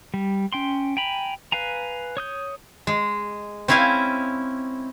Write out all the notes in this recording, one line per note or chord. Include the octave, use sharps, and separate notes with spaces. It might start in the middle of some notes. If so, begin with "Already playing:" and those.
G3
C#4 G5 C6
G5 G#5 A#5 B5
B4 F5 G#5 A#5
C#5 D#6 G6
G#3
C4 C#4 E4 F5 G#5